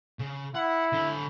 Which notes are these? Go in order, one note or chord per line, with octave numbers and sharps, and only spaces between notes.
C#3
E4 F#5
D3 B5